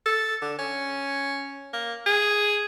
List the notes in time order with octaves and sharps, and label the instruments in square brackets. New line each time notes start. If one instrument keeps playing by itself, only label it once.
[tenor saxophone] A4
D3
C#4
A#3
G#4